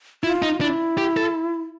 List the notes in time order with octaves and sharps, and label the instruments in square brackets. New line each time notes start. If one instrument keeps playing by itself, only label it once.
[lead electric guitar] E4 [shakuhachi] F4
[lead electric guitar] D#4
[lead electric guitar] D4 [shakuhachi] E4
[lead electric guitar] G4
A4